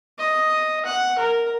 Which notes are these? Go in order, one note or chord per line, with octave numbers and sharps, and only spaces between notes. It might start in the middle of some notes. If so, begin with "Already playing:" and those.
D#5
F#5
A#4